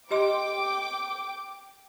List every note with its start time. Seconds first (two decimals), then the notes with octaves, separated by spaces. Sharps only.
0.11 G4 D#5 G5 C6 D6